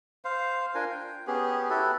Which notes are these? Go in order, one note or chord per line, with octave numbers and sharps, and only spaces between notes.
C5 F5
D4 F4 A#4 G#5
G5
B3 C#4 G4 G#4
E4 F#4 G4 A4